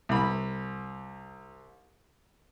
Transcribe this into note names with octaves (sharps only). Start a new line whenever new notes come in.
C2 B5